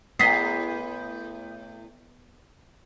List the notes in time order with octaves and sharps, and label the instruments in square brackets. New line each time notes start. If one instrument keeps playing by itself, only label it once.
[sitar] A2 D#5 [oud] B3 G#4 [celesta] B6 C7